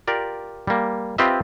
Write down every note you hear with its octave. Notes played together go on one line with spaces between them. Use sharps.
F4 G4 A#4 D5
G3 A#3
C4 F4 G4 B4 D#5 E5